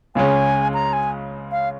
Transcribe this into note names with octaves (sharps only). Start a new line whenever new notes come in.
C#2 C#3 G#3 C#4 G#5
A#5
G#5
F5